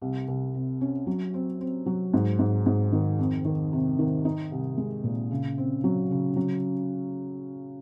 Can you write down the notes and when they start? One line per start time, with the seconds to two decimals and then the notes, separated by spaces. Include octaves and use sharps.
0.02 C2
0.28 C2
0.54 C3
0.81 C#4
1.07 F#3
1.34 C4
1.61 C4
1.86 F#3
2.14 G#2
2.39 G#2
2.66 G#2
2.93 D#3
3.18 F2
3.45 D#3
3.73 C3
3.99 D#3
4.25 D#4
4.51 C2
4.78 G#3
5.04 A#2
5.31 C#3
5.58 C4
5.84 F#3
6.11 C#3
6.36 F#3